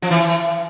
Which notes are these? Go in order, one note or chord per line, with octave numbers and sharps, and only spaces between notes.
F3
E3